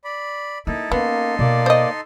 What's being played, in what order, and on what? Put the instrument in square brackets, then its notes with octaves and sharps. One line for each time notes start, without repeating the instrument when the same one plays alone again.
[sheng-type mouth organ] D5 B5
[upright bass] A#3 [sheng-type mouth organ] D#4 E4 A4
[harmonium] A#3 [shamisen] B3 [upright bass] C#4 [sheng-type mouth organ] D#4 A4 C6
[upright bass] B2 [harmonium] A#3 D5
[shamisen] C5 D#5